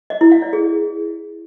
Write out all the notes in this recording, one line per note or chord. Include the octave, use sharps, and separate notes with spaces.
D#5
E4
F5
D5
G#4